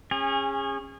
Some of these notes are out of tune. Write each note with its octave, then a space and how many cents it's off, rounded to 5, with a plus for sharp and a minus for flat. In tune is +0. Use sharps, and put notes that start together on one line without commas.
C#4 -15 G#4 -30